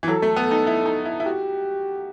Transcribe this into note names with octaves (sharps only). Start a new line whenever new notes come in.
E3
F#3 A4
A3
B3
D#4
E4
D#4
E4
E4
F#4 G4